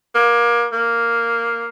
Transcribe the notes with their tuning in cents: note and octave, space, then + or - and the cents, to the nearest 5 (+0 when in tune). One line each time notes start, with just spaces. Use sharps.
A#3 +25
A#3 -5